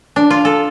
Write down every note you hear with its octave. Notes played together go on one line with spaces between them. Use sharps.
D4
F4
A4